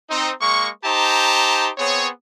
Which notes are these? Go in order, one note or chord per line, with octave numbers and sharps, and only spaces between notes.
C4 D#4
G#3 A#3 C#6
D#4 G4 C5 A5 A#5
B3 C4 G#4 C#5